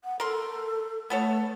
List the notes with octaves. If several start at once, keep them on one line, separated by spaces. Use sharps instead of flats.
F#5
A4 A#4 C6
A3 B3 A4 C#5